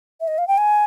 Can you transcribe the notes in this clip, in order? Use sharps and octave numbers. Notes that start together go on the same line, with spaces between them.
E5
D#5
F5
G5
G#5